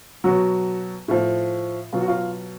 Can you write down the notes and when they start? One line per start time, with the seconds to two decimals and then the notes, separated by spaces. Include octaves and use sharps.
0.24 B2 F#3 F#4
1.08 A2 F3
1.93 B2 F#3 F4
2.01 F#4
2.08 F4